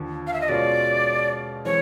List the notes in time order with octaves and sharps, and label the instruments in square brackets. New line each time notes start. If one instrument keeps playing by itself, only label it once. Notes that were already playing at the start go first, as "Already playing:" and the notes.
Already playing: [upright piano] D#2 D3 F3
[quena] F5
E5
D#5
[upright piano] B2 G#3 C#4 F4 [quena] D5
[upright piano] E3 G#3 C4 [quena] C#5